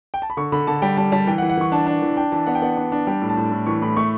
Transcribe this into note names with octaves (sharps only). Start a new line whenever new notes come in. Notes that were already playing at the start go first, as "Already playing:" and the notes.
G5
A5
B5
D3 C#6
D3 B5
D3 A5
G3 G5
G3 A5
G3 A5
E3 G5
F#5
E3
F#5
E3 C#6
D4 A5
D4
E3
D4 G5
E3 A5
B3 F#5
G5
B3 F#5
D4
D4
G3 G5
A2
A5
A2
A2
E3 C#6
A2 B5
A3 C#6